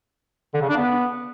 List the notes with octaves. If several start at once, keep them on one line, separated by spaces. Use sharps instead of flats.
D3
C#3
D4
B3